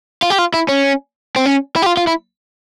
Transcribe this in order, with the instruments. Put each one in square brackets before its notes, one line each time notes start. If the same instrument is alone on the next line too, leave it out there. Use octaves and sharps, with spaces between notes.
[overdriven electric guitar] F4
G4
F4
E4
C#4
C4
C#4
E4
G4
F4
F4
E4